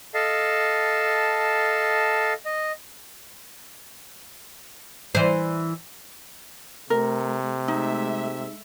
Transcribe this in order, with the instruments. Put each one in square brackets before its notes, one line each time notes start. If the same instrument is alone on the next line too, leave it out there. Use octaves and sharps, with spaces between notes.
[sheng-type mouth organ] A4 D#5 F5 A5
D#5
[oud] E3 C5
[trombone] C3 [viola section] A3 [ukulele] A#4
[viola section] G#3 A3 E5 [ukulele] D#4